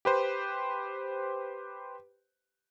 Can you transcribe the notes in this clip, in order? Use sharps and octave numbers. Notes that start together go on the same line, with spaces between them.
G4 B4 C5